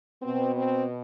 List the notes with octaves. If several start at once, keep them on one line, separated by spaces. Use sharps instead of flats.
B2 B3 C4
C4